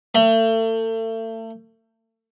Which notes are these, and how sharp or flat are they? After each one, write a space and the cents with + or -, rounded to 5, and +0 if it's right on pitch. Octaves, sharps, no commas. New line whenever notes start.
A3 +35